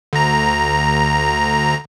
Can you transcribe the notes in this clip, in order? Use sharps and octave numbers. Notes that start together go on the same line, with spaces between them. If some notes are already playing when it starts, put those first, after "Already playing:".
D2 A#5